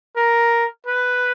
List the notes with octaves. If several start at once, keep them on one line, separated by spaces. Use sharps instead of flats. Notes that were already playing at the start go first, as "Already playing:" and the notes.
A#4
B4